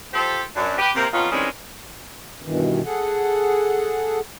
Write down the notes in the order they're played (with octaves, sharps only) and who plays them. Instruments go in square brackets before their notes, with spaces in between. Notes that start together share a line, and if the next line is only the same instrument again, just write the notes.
[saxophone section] F3 G4 A4 C5
F#2 D4
G4 B4
C3 A#3 C4
F2 B3 C#4 D#4 F4
D#3 E3 G3 G#3 C4 C#4
[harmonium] G2 B2 D#3 E3
G#4 A4 F#5